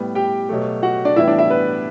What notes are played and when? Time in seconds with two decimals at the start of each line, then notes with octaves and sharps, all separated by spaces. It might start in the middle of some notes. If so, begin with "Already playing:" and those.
Already playing: A2 G3 B3
0.15 G4 G5
0.49 B2 F#3 A3
0.83 F#4 F#5
1.05 D4 D5
1.16 A2 E3 G3 B3 E4 E5
1.28 D4 D5
1.39 E4 E5
1.50 B3 B4